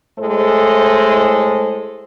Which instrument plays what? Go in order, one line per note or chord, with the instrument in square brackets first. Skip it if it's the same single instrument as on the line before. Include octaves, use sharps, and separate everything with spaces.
[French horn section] A2 G#3 E4 A4 C5